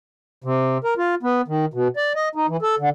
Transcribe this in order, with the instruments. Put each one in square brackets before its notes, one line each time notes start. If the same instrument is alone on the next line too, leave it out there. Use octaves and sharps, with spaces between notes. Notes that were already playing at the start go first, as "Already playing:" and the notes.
[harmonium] C3
A#4
F4
B3
D#3
B2
D5
D#5
D#4
E3
A4
D3